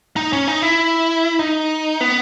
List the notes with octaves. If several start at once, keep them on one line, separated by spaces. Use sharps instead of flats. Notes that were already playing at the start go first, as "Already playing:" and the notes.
D#4
C#4
D#4
E4
D#4
B3